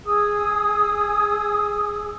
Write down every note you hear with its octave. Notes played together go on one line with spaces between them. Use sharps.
G#4 D#6 E6